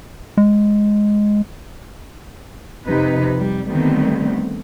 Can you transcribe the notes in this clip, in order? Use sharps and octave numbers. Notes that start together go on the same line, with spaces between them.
G#3
F2 C3 D#4 B4
G3
D3 D#3 G3 A3 B3 C4